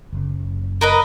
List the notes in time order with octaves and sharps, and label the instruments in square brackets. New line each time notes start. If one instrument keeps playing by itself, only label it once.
[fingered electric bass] F#1 C#3
[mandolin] A#4 B4 D#5